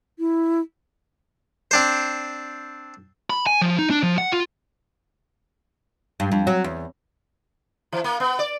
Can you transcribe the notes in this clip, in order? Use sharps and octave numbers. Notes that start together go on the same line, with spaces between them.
E4
C4 D4 C5
B5
G#5
F3
D#4
D4
F3
F#5
F4
G2
F2
F#3
E2
E3
A#3
B3
D5